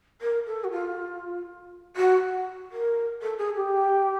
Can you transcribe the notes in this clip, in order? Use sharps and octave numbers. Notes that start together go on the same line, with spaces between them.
A#4
A4
F#4
F4
F#4
A#4
A4
G#4
G4